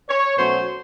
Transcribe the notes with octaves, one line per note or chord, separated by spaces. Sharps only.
C#5
B2 F#3 A3 C#4 C5